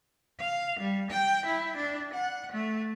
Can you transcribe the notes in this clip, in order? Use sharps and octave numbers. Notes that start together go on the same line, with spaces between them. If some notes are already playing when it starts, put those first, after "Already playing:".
F5
G3
G5
E4
D4
F#5
A3